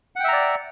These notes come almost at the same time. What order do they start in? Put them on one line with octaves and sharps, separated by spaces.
F#5 G5 E5 A#5 D5